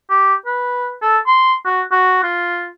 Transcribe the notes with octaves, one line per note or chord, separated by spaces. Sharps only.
G4
B4
A4
C6
F#4
F#4
F4